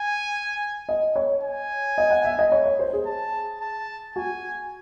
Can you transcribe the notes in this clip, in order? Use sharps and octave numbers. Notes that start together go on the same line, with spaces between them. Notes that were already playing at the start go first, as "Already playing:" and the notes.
Already playing: G#5
D#5
C#5
G#5
D#5
F#5
E5
D#5
C#5
C#5
C5
G#4
A5
A5
F#4 G#5